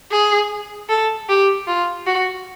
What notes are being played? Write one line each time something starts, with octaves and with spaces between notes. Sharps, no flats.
G#4
A4
G4
F4
F#4